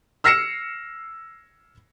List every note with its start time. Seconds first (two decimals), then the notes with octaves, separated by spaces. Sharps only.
0.24 E6 F6 A#6 C7 C#7 E7